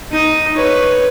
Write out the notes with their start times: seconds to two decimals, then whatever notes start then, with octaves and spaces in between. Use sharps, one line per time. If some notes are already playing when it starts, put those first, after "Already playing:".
0.11 D#4 D#6
0.55 B4 C#5